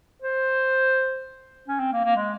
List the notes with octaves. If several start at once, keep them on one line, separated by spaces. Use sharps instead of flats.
C5
C#4
C4
A#3
A#3
G#3